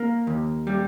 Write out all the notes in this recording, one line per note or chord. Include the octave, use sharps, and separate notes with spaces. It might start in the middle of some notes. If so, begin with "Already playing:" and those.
Already playing: A#3
D#2
G3